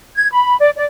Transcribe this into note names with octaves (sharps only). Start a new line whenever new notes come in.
G#6
B5
D5
D5